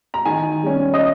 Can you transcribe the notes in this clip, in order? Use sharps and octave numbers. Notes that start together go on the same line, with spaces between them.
A#5
D#3 G#5
G3 C#4
D#5